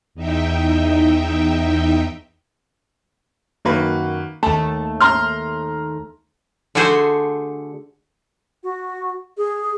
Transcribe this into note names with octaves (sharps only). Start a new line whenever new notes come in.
E2 D#4 E5 G5
F#2 D#3 A#3 F#4 B4
D#2 A3 A5
A#5 C6 F6
D3 A3 F#4 G#4 C5
F#4
G#4